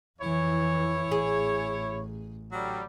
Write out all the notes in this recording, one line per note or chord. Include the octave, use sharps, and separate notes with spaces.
F2 E3 E4 C#5
A1 G#4
D3 F#3 G3